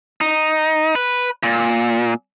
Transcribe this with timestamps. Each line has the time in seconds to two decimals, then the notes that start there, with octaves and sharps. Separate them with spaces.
0.21 D#4
0.95 B4
1.43 A#2